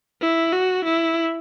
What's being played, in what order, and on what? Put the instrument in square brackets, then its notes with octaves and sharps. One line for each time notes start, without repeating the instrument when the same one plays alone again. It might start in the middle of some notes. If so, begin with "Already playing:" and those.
[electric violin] E4
F#4
E4